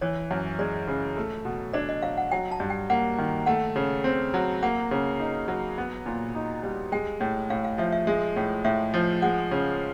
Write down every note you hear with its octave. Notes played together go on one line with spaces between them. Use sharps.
E3 C#5
F#2
G#3 D5
C#3
A3
B2
D4 D5
D#5
F#3 F5
F#5
F#3 G5
A5
G2
G5
A#3 F#5
D#3
A3 F#5
C#3
C4
F#3
A#3 F#5
C#3
D#4
F#3
B3
A#2
D#4
G3
G#3 G5
A2
A2 F5
F5
F3 E5
E5
G#3 E5
A2
A2 E5
F3
G#3 F#5
C#3